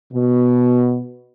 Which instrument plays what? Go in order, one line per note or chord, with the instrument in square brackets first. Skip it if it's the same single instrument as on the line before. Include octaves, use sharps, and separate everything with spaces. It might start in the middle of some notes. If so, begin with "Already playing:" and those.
[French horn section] B2